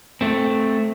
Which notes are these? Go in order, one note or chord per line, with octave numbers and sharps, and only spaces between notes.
A3 C4